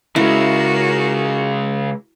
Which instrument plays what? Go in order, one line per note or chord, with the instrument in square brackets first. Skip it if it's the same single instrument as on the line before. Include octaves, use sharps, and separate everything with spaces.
[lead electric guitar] C#3 G#3 [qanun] E4 [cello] F#4 A#4